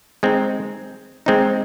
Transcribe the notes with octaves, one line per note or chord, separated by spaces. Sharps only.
G#3 C4 D#4
G#3 C4 D#4